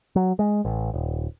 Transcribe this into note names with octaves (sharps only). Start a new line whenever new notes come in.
F#3
G#3
A1
D#1